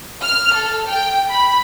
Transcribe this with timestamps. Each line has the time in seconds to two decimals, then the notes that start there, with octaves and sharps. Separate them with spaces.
0.21 F6
0.54 A4
0.88 G5
1.30 B5